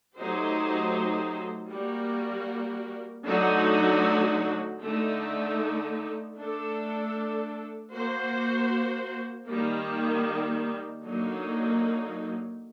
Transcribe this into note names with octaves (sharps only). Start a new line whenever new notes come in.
F#3 A3 D#4 G4 C5
G3 A#3 F#4 A#4
D3 F#3 A3 D#4 F#4
D3 A3 D#4
A3 D4 A4
A#3 F#4 C5
D#3 G3 A#3
D3 F#3 A#3 D#4